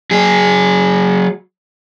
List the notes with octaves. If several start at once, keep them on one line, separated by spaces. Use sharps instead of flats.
F#3 G#4